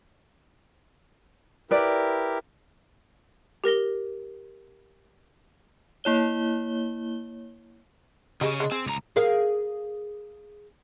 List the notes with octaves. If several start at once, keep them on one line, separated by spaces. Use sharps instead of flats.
E4 G4 A#4 B4 D5
G4 A#4 A#6 G7
A#3 E4 C#5 G7
C#3 C#4 G4 G#4 D#5
G#3 A#3 D4
C4 G#4
C#2 A#5
G#4 A#4 F5